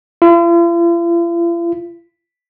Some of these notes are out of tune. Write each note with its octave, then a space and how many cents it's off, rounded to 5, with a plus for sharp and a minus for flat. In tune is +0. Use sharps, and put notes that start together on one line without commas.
F4 -45